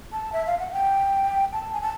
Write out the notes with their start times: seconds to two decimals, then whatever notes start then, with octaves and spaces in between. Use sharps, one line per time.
0.12 A5
0.33 E5
0.47 F5
0.59 F#5
0.73 G5
1.53 A5
1.73 G#5
1.82 A5